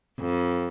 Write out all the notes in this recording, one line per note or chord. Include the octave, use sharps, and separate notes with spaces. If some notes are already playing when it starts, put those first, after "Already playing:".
F2